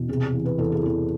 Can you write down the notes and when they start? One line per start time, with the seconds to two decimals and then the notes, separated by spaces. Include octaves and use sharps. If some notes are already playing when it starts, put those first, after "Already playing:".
Already playing: E2 B2
0.08 C3 G#4
0.33 E3
0.45 B4
0.58 E2 A4
0.72 G#4
0.83 E2 A4